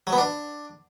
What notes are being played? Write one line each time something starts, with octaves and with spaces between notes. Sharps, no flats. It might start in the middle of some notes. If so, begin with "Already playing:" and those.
F#3
B3
D4